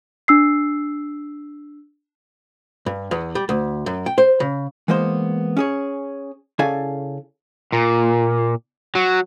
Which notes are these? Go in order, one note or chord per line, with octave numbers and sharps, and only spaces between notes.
D4 E6 C7
G2
E2
G3
D2
F#2
G5
C5
C#3
E3 G#3 A#3 B3 C5
C#4 G#4 C#5
C#3 E4 A4 D5 F5 G#5
A#2
F#3